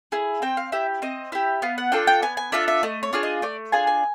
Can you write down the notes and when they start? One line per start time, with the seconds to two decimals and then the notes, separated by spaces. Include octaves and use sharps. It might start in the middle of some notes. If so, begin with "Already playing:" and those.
0.12 E4 G#4
0.42 C4 G5
0.57 F5
0.72 E4 G4 E5
1.02 C4 D#5
1.32 E4 G4 E5
1.62 B3 F5
1.78 F#5
1.92 D4 F4 A4 G5
2.07 G5
2.22 B3 G#5
2.37 G#5
2.52 D4 F4 A4 E5
2.68 E5
2.83 A3 D#5
3.03 C#5
3.13 D4 F4 G#4
3.23 D#5
3.42 A3 D5
3.72 D4 F4 G#4 G#5
3.87 G#5